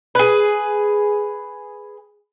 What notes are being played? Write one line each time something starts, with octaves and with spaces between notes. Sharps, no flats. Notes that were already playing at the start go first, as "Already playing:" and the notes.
G#4 B4